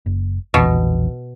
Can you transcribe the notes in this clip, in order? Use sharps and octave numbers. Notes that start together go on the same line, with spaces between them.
F#1
E1 A#1 B2 E3